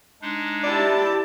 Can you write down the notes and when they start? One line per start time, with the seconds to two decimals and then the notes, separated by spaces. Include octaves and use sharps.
0.22 G#3 D4 D#4
0.63 E4 G4 D5 A5